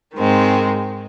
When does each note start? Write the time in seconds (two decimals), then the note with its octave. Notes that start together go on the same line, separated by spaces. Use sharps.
0.15 G#2 D#3 G#3 C4